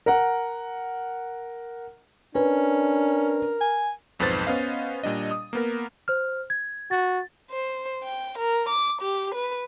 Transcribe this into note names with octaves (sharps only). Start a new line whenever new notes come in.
A#4 F#5
C#4 D4 A#4 B4
G#5
B1 F2 G#2 B4 C5 A6
B3 C#4 C5 D#5 F5
A#2 G3 D4 D#5
D#6
A#3 B3 A#4
C5 F6
G#6
F#4 A6
C5
G5
A#4
D6
G4
B4